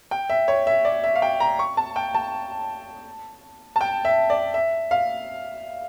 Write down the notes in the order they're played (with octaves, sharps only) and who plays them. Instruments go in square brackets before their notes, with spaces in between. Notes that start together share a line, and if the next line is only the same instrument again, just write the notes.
[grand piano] G5
E5
C#5
E5
D5
E5
F5
G5
A#5
C#6
A5
G5
A5
A5
G5
E5
D5
E5
F5